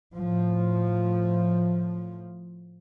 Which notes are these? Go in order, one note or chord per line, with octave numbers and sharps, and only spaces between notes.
A2 F3